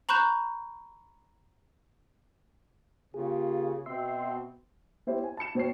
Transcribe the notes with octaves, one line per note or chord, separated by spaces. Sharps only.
A#5 B5 C#6 F#6 G6 E7
C#3 A#3 F4 G4 G#4
B2 C4 E5 C6
B3 C4 E4 G4 C5 C#5
G#5
A5 B5 C#7 E7
B2 C4 C5 C#5 C7